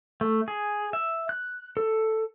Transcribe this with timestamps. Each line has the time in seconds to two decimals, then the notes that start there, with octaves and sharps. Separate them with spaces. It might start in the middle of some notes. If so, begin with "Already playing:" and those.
0.21 A3
0.48 G#4
0.93 E5
1.29 F#6
1.77 A4